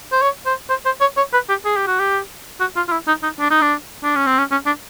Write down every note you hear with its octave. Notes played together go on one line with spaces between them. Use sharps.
C5
C#5
C5
C5
C5
C#5
C#5
B4
G4
G#4
G4
F#4
G4
F#4
F4
F4
E4
D#4
D#4
D4
D#4
D4
D4
C#4
C4
C#4
C#4
D4